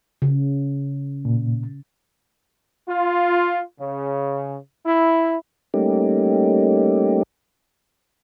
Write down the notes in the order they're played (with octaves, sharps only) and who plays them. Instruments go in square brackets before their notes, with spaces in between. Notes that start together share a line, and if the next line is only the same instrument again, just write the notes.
[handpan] C#3
[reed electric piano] A#2
[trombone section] F4
C#3
E4
[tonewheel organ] G3 A3 A#3 C#4 D#4 G4